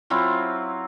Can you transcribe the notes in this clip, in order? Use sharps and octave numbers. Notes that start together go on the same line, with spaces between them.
F#3 C4 E4 F4